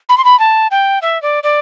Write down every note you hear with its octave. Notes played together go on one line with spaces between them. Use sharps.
B5
C6
B5
A5
G5
E5
D5
D5